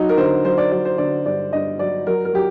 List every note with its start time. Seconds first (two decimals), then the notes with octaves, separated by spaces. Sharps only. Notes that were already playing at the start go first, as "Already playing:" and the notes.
Already playing: F#3 D#4
0.09 A#4
0.17 D3 C5
0.45 F#3 C5
0.58 D5
0.72 F#3 D5
0.85 C5
0.98 D3 D5
1.26 G2 D5
1.53 G2 D#5
1.79 F#3 D5
2.07 F#3 A#4
2.25 A#4
2.33 F#3 G4